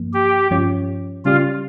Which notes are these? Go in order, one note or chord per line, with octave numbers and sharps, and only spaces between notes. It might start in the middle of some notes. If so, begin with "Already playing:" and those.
Already playing: G2 F3 A#3
G4
G2 F3 C#4 F4 C#5
C#3 G3 C#4 F4 G4 D5